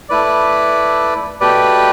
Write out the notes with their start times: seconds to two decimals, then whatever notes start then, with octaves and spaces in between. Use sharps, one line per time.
0.09 A3 E4 B4 D5
1.41 B2 A3 G4 B4 D5